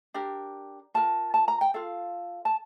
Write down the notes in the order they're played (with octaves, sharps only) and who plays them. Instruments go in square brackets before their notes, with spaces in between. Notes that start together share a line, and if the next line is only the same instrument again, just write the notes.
[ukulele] D4 G4 A#4
F4 A#4 A5
A5
A#5
G5
F4 A4 F5
A5